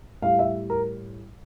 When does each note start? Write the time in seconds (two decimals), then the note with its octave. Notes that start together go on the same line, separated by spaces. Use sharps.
0.22 A2 G3 F5
0.39 E5
0.70 A#4